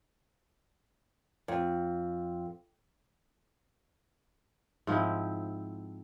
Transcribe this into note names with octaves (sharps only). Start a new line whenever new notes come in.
F2
G#2 F3 C4 E4